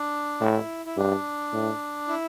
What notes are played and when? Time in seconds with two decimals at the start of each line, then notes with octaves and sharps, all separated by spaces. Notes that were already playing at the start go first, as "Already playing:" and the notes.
Already playing: D4
0.40 A2 E4
0.86 E4
0.97 G2 D4
1.53 A2
2.08 E4